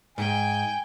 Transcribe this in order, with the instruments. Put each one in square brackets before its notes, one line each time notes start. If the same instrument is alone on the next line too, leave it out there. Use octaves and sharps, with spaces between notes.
[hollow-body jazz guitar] G#2 [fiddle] G5 [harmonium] G#5